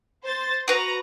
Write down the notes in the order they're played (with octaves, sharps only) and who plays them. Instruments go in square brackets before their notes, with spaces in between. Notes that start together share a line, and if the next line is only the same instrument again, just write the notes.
[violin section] C5 A6
[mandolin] F#4 B4 [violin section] A#5 A#6